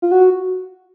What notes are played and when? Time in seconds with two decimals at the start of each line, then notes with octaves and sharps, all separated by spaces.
0.02 F4
0.11 F#4